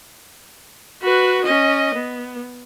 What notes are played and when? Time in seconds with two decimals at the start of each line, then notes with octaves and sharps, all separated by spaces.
1.02 F#4 B4
1.44 C#4 D#5
1.95 B3